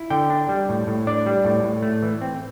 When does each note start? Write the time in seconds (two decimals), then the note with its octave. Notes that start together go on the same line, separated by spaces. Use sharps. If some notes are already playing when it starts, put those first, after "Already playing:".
Already playing: E4
0.10 D3 G5
0.30 D4
0.49 G3
0.69 A2
0.87 A2
1.07 D4 D5
1.26 G3
1.45 A2
1.64 A2
1.82 A3
2.03 E3
2.21 C4